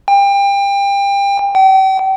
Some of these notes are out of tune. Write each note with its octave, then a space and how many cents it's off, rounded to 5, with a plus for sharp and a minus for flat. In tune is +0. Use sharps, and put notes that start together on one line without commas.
G5 +30
G5 -40